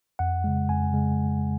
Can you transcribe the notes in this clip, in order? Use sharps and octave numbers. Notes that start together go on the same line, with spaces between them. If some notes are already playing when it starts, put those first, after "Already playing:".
F2 F#5
C#3 G#3
F2 G#5
C#3 G#3